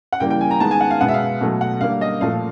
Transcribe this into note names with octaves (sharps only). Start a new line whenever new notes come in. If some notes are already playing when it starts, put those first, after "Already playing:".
F#5
C#3 E3 G3 A#3 G5
G5
G#5
A#5
D#3 G#3 B3 A5
G#5
F#5
F5
B2 G#3 B3 F#5
E5
F5
B2 F#3 A3
F#5
D3 G3 A#3 F5
D#5
A#2 F3 A3 F5